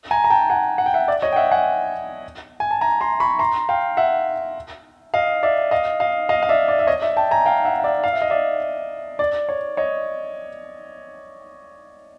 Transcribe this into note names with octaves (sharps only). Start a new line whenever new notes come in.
G#5 A#5
A#5
G5 A5
F#5 G#5
F#5
G5
E5 F#5
D5 E5
C#5 D#5
G5
E5 F#5
F#5 G#5
G#5
A5
G#5 A#5
A#5 C6
B5 C#6
A#5 C6
F5 G5
E5 F#5
D#5 F5
D5 E5
D#5 F5
D#5 F5
D#5 F5
F5
D5 E5
D5
E5
C#5 D#5
D5 E5
G5 A5
G#5 A#5
F5 G5
E5 F#5
F5
D5 E5
F5
E5
D#5
D5 E5
D5
C#5
C#5 D#5